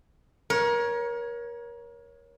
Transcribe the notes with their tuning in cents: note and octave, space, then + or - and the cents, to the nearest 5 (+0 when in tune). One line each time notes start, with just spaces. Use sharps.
A#4 +30 C#5 +0